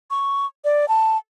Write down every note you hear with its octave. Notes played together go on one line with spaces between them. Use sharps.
C#6
D5
A5